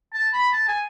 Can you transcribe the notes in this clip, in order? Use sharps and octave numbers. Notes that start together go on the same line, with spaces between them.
A5
B5
A5
G#5